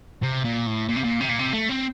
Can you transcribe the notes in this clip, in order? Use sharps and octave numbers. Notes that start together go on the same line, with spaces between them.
C3
A#2
A2
A#2
C3
A#2
C3
A#2
C3
A3
C4